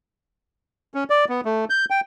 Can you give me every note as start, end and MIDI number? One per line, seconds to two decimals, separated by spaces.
0.94 1.04 61
1.10 1.25 74
1.29 1.41 59
1.45 1.65 57
1.70 1.85 91
1.90 2.01 79